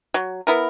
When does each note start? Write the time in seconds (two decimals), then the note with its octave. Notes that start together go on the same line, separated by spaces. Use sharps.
0.14 F#3
0.47 B3 E4 A#4